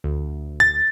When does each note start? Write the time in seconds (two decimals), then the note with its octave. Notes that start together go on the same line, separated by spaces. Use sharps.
0.04 D2
0.60 A6